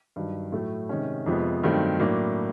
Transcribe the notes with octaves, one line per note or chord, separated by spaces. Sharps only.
G2 D#3 F#3
A2 F#3 A3
C3 D#3 G#3 C#4
F2 C3 F3 G#3 B3
G2 D#3 F#3 A3 C4
A2 F#3 A#3 D4